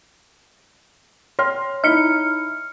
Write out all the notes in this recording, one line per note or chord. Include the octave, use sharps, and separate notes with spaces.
C#5 C6 F6
D#4 E4 F6 C#7